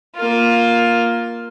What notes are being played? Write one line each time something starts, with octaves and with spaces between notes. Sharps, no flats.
A#3 F4